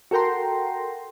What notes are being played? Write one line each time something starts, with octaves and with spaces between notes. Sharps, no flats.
F#4 A4 A#4 G5 A#5 C6